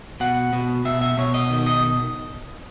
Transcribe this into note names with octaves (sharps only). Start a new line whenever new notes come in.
B2 F#5
B2
B2 E5
E5
B2 C#5
D#5
D#3
D#5